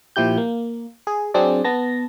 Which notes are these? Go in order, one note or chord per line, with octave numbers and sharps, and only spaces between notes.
A#2 F3 E4 G4 G6
A#3
G#4
F#3 C4 D4 G#4 D5
B3 A5 A#6